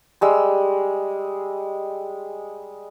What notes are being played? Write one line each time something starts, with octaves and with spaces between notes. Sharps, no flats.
G3 G#3 E6